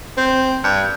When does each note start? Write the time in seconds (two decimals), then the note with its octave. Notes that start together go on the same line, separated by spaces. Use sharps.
0.18 C4
0.64 G2